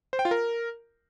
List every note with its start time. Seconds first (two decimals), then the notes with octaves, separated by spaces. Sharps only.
0.13 C5
0.19 G5
0.25 F4
0.31 A#4